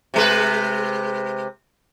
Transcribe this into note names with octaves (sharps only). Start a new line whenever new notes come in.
C3 G#3 B4